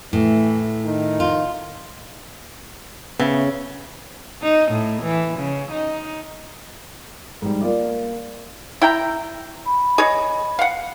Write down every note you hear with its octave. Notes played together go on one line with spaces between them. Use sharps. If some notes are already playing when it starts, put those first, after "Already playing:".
A2 E3
D#3
F4
C#3 B3 C#5 E5
D#4
A2
E3
C#3
D#4
G#2 G3
A#3 F4 D5
E4 G5 A#5
B5
G#4 C#5 D#5
F5 F#5